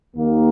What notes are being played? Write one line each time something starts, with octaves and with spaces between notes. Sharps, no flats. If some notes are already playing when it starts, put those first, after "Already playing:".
D#2 D#3 A#3